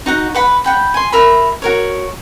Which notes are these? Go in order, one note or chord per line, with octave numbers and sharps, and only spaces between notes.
D#4 F#4 F#5
B4 F#5 B5
F#5 G5 B5
G#5 C6
A#4 E5 B5
F#4 A#4 C#5